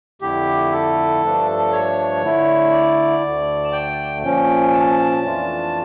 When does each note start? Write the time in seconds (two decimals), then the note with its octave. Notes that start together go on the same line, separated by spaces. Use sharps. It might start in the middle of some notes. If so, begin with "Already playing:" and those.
0.21 F2 D3 A3 E4 G4
0.72 A4
1.22 G2 F3 A3 D4
1.72 C#5
2.22 D3 A3 E4
2.72 D5
3.23 D2 D3 A3
3.64 A5
3.72 G5
4.22 A#2 F3 C#4 G5
4.73 A5
5.23 F2 E3 A3 D4 F4